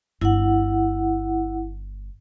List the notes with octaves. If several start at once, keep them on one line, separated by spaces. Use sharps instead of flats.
G1 E4 F#5